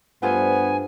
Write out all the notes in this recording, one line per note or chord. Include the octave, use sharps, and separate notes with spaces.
G2 A3 B3 F4 C5 G#5